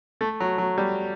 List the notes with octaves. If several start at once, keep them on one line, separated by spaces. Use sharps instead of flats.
A3
F#3
F#3
G3